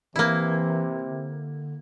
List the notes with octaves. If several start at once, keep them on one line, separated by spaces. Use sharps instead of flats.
C3 E3 A#3 E4
D3